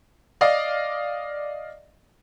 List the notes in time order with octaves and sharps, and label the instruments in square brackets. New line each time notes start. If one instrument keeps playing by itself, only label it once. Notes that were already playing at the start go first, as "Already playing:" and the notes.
[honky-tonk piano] D5 D#5 F5